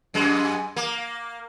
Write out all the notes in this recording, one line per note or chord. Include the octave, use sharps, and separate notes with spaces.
F#2 G#3
A#3